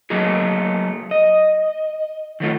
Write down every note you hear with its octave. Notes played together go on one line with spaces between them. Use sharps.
F#3 A3 A#3 D#4 F#4 G#4
D#5
D#3 F#3 A3 F4